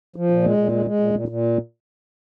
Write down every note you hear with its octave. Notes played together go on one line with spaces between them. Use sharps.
F3
A#2
G#3
A#2
G#3
G#3
A#2
A#2
A#2